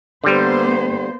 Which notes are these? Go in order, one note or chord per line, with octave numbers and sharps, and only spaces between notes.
D3 G3 A#3 B3 C5